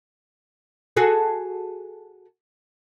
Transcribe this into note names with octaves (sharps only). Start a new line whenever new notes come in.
F#4 G#4 A4